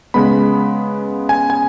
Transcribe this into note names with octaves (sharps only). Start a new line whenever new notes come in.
C#3 G#3 B3 B5
G#5
G#5